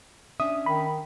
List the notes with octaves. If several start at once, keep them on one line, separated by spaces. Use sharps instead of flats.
C#4 D4 E5 D#6
D#3 B5